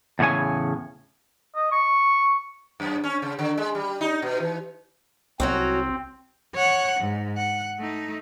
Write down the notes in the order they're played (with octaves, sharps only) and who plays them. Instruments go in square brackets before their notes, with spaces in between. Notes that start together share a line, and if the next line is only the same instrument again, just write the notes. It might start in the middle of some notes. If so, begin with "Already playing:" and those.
[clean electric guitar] E2 A2 C#3 C#5 G#5
[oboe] D#5
C#6
[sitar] F#2
C#4
C#3
D3
G#3
G3
D#4
B2
E3
[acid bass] C2 [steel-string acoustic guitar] F#3 C#4 F#4 [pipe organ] C4
[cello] C#5 F#5
G#2
F#5
A3 D#4